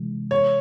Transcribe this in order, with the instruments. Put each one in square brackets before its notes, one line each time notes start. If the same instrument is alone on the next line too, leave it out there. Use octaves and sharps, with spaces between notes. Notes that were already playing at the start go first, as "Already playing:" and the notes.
Already playing: [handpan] C3 E3 G#3
[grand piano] C#5